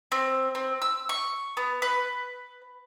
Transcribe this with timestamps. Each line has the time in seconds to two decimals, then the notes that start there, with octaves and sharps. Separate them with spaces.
0.12 C4
0.55 C4
0.82 E6
1.09 C#6
1.57 B3
1.82 B4